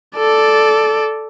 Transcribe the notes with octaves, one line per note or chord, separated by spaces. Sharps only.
A4 D5